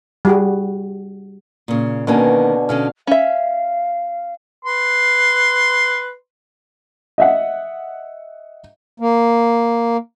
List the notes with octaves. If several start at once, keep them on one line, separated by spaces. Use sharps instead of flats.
G3 F#4 G#4
A#2 C#3
B2 D3 D#3 A#3 C#4 G#5
B2 D3 C#4 F5
C#4 E5 F5
B4 C6
D#5 E5 F#5
A#3